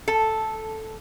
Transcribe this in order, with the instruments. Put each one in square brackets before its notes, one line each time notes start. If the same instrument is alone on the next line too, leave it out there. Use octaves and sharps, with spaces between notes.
[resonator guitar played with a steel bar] A4